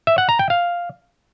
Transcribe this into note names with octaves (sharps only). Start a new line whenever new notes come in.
E5
F#5
A#5
G5
F5